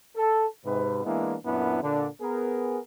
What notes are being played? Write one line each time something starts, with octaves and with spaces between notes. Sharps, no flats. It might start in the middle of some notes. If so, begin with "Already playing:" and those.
A4
G#2 C3 B4
E3 G#3 A#3 B3 D4 E4
F#2 A#2 B3 D4 E4
A#2 D3 D4
B3 G#4 A#4